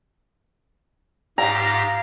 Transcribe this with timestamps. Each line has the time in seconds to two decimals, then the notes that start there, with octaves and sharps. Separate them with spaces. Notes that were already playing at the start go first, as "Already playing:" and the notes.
1.38 G#2 G4 F5 A#5 A#6